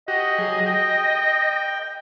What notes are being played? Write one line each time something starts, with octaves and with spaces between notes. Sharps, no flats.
F#4 G4 D#5
F#3 G#4
G5